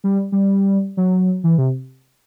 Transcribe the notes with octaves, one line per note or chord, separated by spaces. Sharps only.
G3
G3
F#3
E3
C3